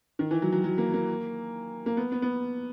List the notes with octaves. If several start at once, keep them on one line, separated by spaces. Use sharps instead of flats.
D#3
E3
F#3
F#3
F#3
A#3
A#3
A#3
B3
B3
B3